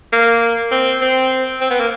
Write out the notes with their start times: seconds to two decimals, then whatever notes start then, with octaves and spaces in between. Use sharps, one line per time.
0.13 A#3
0.71 C4
1.02 C4
1.61 C4
1.70 B3
1.80 A#3